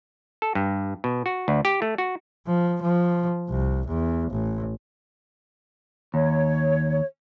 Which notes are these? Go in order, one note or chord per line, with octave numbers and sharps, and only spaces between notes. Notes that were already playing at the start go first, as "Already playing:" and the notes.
A4
G2
B2
F#4
D2
G4
A3
F#4
F3
F3
C2
E2
A1
D#2 C#5